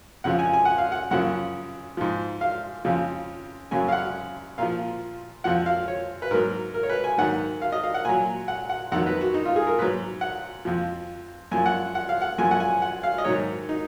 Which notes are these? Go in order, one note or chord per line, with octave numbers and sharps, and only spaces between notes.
F2 C#3 F3 F#5
G#5
G#5
F#5
F5
F#5
F#2 C#3 F3 F#5
G#2 F3
F5
F2 C#3 F3
F#2 C#3 F#3 G#5
F5
F#5
A#2 F3 F5
F2 F3 F#5
F5
C#5
B4
G#2 F#3 A#4
A#4
C#5
B4
G#5
G#2 D#3 F#3 F#5
F5
D#5
F5
F#5
A#2 F#3 G#5
F#5
F#5
F2 D#3 F#3 F#5
B4
F#4
D#4
F4
G#4
A#4
G#2 F#3 B4
F#5
F2 F3
F#2 F3 G#5
F#5
F#5
F5
F#5
F#2 F3 G#5
F#5
G#5
F#5
F5
D#5
G#2 D#3 F#3 C#5
D#4